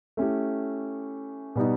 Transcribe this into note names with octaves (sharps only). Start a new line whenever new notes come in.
A3 C#4 E4 G4
B2 G3 B3 D#4